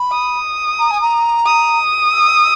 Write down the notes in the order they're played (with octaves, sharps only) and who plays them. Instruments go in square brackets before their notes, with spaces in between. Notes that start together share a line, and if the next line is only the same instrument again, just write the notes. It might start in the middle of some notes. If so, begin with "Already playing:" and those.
Already playing: [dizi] B5
[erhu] D#6
[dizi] A#5
G#5
A#5
[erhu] D#6
[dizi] E6